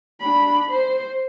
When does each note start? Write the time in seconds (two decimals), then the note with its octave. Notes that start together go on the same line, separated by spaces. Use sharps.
0.20 D4 B5
0.70 C5